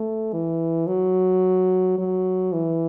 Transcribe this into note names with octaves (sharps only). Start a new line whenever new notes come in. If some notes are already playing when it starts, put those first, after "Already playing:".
Already playing: A3
E3
F#3
F#3
E3